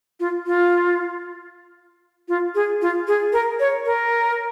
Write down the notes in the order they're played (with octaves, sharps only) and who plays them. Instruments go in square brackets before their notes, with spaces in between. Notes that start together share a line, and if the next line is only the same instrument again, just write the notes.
[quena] F4
F4
F4
G#4
F4
G#4
A#4
C#5
A#4